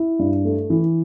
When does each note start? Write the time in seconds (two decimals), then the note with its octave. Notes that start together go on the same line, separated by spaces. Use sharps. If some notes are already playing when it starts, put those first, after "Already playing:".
Already playing: E4
0.19 G2
0.45 A3
0.70 E3